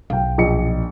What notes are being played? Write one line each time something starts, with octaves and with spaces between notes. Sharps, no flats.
B1 F5 G5
A#1 D#5 C#7